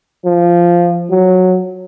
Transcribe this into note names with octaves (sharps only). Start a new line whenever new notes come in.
F3
F#3